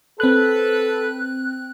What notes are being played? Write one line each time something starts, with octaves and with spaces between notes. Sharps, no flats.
C4 A4 B4 F#6